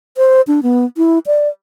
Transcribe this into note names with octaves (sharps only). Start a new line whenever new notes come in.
C5
D4
B3
E4
D5